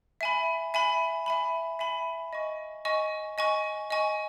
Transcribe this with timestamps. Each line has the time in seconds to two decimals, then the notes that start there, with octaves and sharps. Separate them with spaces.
0.21 E5 G#5 B5
0.74 E5 G#5 B5
1.26 E5 G#5 B5
1.79 E5 G#5 B5
2.33 D#5 G#5 C#6
2.85 D#5 G#5 C#6
3.38 D#5 G#5 C#6
3.90 D#5 G#5 C#6